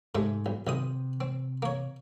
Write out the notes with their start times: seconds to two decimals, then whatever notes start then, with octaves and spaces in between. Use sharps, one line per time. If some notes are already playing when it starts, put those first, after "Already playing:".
0.15 G#2 C3 G#3 A3
0.46 B1
0.67 B1 C3 D#3 D#6
1.21 C4
1.62 A#3 C#5